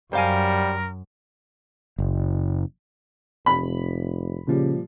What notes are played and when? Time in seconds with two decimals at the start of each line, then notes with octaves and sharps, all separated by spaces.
0.13 F#2 G3 A#4 C5 F5 G#5
1.98 F#1
3.46 F1 C3 B5
4.47 A#2 C#3 F3 G3